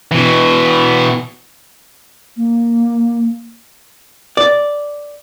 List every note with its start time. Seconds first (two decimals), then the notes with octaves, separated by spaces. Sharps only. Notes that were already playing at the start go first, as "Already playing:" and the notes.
0.11 B2 E3
2.37 A#3
4.37 D5